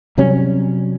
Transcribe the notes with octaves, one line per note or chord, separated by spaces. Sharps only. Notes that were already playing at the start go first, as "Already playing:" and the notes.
C3 F#3 G3 C#4